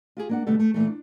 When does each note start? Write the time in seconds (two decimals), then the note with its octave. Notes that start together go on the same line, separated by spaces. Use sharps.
0.17 F4 G4 G#4
0.29 A#3 D4 F#5
0.47 B2 D3 G3 A3 B3 A4
0.59 A3
0.74 A#2 E3 A3
0.87 D4